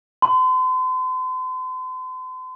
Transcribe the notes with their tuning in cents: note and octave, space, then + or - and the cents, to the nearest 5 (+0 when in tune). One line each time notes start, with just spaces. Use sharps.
C6 -40